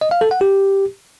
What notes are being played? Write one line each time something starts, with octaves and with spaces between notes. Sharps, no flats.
D#5
F5
A4
F#5
G4